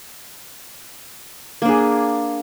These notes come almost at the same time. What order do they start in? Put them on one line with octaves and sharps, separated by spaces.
A#3 D4 G#4